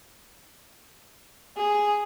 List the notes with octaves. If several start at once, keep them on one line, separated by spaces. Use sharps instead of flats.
G#4